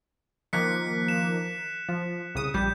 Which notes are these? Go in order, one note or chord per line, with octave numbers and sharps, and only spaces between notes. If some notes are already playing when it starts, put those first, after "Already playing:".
D#3 F3 A#3 F#6 B6 C#7
E7
F3
C2 C#3 D#6
A#1 G3 G6